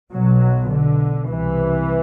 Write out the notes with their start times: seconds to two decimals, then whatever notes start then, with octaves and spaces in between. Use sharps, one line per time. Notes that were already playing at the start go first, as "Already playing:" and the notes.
0.12 B1 B2 F#3
0.70 D3
1.27 C2 C3 E3